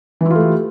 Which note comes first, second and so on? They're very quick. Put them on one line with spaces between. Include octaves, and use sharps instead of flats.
E3 E4 F4 A3 G4